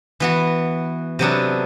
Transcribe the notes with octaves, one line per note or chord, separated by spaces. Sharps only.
E3 B3 F#4
C3 F#3 B3 D4 A4